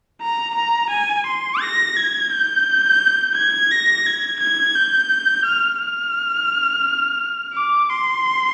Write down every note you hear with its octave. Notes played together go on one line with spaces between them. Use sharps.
A#5
A#5
G#5
C6
A#6
G#6
G6
G#6
A#6
G#6
G#6
G6
F6
F6
D6
C6